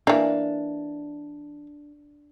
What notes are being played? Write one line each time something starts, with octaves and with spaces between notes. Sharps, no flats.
E3 A#3 D4